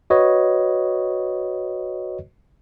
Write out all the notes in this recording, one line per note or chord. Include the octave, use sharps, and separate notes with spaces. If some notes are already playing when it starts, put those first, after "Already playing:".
F#4 B4 C#5 D#5